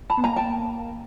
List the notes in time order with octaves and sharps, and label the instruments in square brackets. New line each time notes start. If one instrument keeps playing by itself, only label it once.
[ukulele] A5 B5
[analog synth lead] B3
[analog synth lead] A#3 [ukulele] G#5 A#5
[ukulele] G5 A5